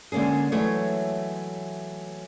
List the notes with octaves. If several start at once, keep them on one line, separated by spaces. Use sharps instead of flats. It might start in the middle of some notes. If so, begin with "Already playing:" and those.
D3 G#3 A#3 C#4 G#4
E3 F#3 G#3 A3 C#5